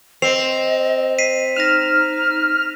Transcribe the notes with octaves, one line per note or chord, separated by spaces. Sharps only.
C4 D#5 C7 F7
B6 C7 D#7
D#4 F6 A#6 E7